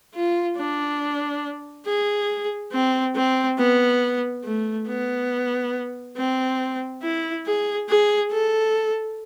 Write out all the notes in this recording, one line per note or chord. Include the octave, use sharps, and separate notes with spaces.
F4
D4
G#4
C4
C4
B3
A3
B3
C4
E4
G#4
G#4
A4